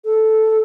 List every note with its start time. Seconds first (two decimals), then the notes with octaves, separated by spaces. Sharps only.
0.05 A4